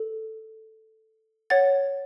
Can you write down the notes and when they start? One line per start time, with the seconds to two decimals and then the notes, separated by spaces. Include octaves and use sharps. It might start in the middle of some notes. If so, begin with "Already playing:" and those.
Already playing: A4
1.50 C#5 F#5 A6